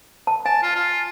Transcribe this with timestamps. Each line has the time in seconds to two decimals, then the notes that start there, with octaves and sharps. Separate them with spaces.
0.27 A5
0.46 G#5 A5
0.63 F4
0.75 F4